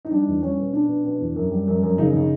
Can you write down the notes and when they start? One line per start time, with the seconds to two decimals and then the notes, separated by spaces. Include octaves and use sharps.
0.05 D#4
0.11 G3 D4
0.27 E2
0.42 G3 C#4
0.58 B2
0.73 B2 D4
0.89 B2
1.04 B2
1.20 E2
1.36 F#2
1.52 G3
1.68 F#2
1.83 F#2
1.98 C#3 D#4
2.14 C#3